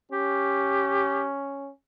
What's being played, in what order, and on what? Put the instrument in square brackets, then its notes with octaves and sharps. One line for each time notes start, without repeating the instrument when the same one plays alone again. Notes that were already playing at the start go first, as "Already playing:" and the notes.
[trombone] C#4 [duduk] G4